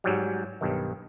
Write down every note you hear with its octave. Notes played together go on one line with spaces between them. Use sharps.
G#2 F#3 G3
B1 G2 D#3